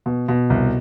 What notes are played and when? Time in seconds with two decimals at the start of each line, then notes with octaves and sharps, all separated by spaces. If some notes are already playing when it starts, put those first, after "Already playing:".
0.06 B2
0.28 B2
0.50 C2